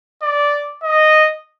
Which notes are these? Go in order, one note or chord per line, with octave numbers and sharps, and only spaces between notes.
D5
D#5